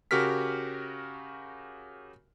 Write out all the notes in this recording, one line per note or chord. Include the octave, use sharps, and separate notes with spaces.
C#3 F#4 G4 A#4 F6 B6